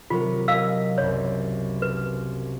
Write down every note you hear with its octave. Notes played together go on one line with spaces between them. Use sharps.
C3 F#3 F4 A#4
A#4 D#5 F5 G#5 E6
F#1 C2 C#5
B4